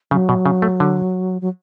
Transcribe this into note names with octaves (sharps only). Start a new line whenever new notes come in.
C#3 F#3
B2
C#3
A3
D3
F#3